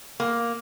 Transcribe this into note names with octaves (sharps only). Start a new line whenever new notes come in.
A#3